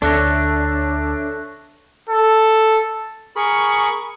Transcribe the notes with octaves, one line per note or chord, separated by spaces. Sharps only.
D2 D4 A4 C#5 E5 C#6 F#6 A#6
A4
G#4 A#4 B5 C#6